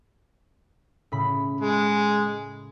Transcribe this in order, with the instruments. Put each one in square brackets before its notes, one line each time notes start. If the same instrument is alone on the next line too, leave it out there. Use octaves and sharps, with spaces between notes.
[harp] A2 C#3 B5
[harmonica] G#3